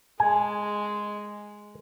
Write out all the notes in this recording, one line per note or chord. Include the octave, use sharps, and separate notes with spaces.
G#3 G#5